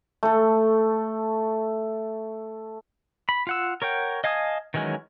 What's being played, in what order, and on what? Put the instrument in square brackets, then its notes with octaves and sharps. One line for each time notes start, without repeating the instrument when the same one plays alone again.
[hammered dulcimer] A3 A4
[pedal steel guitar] B5
F4 F#5 E6
A#4 C#5 F#5 G5
D#5 F5 G#5 A5 D#6
D#3 E3 F#3 G#3 C#4